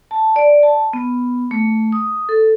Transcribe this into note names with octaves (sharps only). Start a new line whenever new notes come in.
A5
D5
A5
B3
A3
D#6
A4